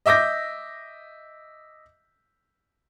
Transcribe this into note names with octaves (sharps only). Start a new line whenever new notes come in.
D#5 E5 D6 G6 A#6